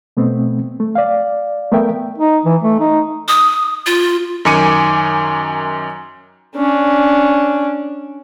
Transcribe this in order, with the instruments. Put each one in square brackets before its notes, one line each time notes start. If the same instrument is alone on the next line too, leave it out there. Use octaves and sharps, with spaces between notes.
[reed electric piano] B2 A3 B3 C4
A3
D5 F5
A3 B3 A#4 E5 G5
[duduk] D#4
E3
A3
D#4
[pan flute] D#6
F4
[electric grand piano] F#2 D#3 G#5 D6 C#7 D#7
[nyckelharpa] C#4 D4